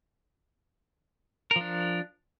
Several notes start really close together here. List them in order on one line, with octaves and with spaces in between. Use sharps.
A#4 F3 D4